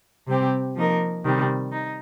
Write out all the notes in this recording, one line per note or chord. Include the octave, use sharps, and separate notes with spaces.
C3 G3 C4 G4
F3 A#3 D#4 A#4
C3 D#3 G3
D#4